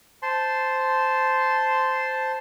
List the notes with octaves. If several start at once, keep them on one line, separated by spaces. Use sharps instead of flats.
C5 A5 C6